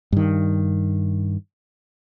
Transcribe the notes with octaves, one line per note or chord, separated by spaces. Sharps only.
G2 D#3